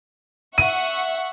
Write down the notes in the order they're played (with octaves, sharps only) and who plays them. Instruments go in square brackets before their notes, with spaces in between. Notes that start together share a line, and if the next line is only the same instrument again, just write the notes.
[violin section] E5 F#5 C#6 [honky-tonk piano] D#7